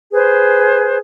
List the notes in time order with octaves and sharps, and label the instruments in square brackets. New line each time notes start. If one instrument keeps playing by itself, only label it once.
[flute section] G#4 B4 C5